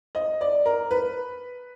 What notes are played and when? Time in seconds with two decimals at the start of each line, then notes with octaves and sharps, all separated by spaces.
0.15 D#5
0.41 D5
0.66 A#4
0.91 B4